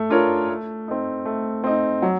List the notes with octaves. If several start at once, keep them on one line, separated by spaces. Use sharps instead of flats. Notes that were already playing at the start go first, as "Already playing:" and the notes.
Already playing: A3
D4 F4 A#4 C#5
A3
C4 D#4
A3
C4 D#4
F#3